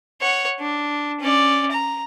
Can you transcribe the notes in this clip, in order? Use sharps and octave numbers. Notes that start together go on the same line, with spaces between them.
C#5 F#5
D4
C#4 D5
A#5